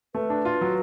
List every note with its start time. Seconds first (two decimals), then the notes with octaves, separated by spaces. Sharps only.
0.15 A3 B4
0.30 D4
0.45 F4
0.61 F#3